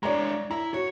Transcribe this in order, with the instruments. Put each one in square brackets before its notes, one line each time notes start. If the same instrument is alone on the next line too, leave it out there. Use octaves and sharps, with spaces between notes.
[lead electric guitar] G#3 D4 [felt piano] C#5 D5 A#5
[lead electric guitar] E4 [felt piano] A#5
[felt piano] F#4 [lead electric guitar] C#5